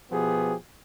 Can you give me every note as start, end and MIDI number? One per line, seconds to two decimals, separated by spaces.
0.11 0.54 47
0.11 0.54 53
0.11 0.54 59
0.11 0.54 67
0.11 0.54 68